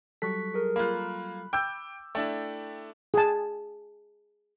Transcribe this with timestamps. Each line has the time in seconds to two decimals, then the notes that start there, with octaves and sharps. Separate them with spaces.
0.22 F#3 G3 A4 C#6 F#6 B6
0.54 G#4 A#4
0.76 A#3 F4 B5 F#6
1.53 G5 D6 E6 G6
2.15 A3 D4 E4 G5
3.14 G#4 A5